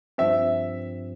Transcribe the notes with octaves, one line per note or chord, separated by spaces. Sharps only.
G2 F3 C4 E5